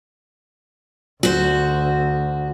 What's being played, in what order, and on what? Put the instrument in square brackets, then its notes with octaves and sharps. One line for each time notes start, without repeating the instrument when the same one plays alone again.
[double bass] D2 [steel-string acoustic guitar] F#4 C5